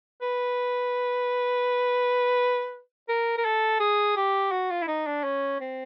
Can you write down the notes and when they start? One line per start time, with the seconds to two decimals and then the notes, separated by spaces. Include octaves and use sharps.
0.22 B4
3.09 A#4
3.38 A#4
3.45 A4
3.80 G#4
4.17 G4
4.52 F#4
4.70 F4
4.82 E4
4.87 D#4
5.06 D4
5.23 C#4
5.60 C4